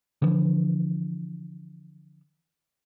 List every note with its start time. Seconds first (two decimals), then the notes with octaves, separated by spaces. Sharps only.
0.22 D3 E3 F3